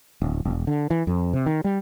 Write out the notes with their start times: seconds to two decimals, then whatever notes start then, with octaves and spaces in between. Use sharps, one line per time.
0.22 D1
0.45 E1
0.67 D3
0.90 E3
1.07 F2
1.33 C3
1.46 D#3
1.64 G3